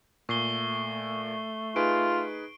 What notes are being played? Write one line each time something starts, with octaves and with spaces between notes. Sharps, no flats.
A#2 A3 C#6 C7 G7
D#4 F4 G#4 B4 D7